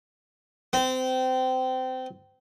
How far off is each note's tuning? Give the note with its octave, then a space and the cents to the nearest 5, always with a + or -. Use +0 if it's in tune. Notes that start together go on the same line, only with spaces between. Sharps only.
C4 -25